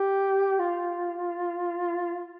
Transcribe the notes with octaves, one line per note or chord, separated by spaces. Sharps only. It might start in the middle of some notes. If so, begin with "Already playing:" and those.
Already playing: G4
F4